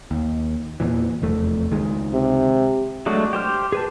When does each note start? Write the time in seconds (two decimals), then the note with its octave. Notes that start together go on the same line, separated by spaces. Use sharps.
0.11 D#2
0.80 E2 A#2 E3
1.22 F1 E2 A3
1.71 C#2 D#3 G#3
2.14 C3
3.06 F#3 G#3 A3 D4 F#4
3.33 G4 C5 F6
3.72 G#4 B4 A5